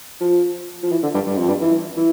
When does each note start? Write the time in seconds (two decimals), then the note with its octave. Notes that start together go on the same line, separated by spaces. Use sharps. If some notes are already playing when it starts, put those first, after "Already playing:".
0.21 F3
0.83 F3
0.91 E3
1.03 D3
1.14 G2
1.26 G2
1.37 F2
1.48 G2
1.61 E3
1.97 E3